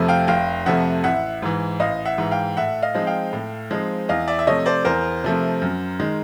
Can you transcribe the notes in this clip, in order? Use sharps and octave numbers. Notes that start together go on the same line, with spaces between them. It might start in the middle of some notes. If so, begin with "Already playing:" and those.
Already playing: F2 C3 F3 A3
F5 G5
F1 F5 G5
F2 C3 F3 A3 E5 F#5
A1 E5 F#5
G#2 E3
A1 D#5 F5
E5 F#5
G#2 E3
F5 G5
A2 E5 F#5
D#5 F5
F3 G#3 C4 D#4
F5 G5
A2
F3 G#3 C4 D#4
E2 D#5 F5
D5 E5
E5
C3 F3 A3 C#5 D#5
C5 D5
E2 A#4 C5
C3 F3 A3
F#2
D#3 G#3